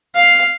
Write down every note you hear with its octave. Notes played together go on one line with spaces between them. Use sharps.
F5